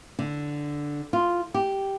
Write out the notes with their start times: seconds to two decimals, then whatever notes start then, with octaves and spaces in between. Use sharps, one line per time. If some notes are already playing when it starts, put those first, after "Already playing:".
0.19 D3
1.13 F4
1.54 G4